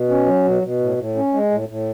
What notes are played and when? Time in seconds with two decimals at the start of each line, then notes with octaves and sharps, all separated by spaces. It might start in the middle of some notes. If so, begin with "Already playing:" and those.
Already playing: B2
0.10 C#4
0.26 F#3
0.45 B2
0.62 B2
0.80 A2
0.98 A2
1.16 C#4
1.34 G#3
1.51 A2
1.69 A2